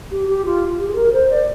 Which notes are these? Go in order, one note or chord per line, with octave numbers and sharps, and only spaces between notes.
G4
G4
F4
G4
G#4
A#4
C5
D5